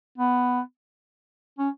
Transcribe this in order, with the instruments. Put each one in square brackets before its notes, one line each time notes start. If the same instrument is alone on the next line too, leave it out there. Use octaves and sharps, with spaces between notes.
[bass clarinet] B3
C#4